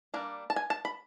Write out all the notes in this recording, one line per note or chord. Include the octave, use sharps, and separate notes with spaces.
G3 A#3 D4
A5
G#5
A5
B5